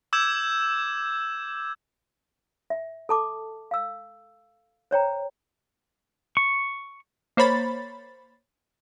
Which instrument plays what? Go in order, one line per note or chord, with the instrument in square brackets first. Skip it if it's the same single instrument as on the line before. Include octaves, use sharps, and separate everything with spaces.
[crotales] D6 E6 G6 G#6 E7
[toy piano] E5
A4 A5 D6
F5 E6
C5 C#5 G5 A#5
[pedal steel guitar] C#6
[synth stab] A#3 C5 C#5 B5 A6